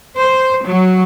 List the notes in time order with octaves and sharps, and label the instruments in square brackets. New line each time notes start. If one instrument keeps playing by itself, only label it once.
[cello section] C5
F#3